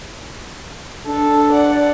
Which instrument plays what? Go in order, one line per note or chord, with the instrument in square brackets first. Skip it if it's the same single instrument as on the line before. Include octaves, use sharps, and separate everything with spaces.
[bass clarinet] D4 [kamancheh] A4
[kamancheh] D5 F#5